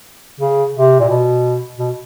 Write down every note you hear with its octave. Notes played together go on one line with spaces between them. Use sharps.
C#3
C3
A#2
B2
B2